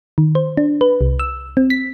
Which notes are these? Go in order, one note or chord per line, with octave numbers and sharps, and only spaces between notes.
D#3
C5
D4
B4
C2
E6
C4
B6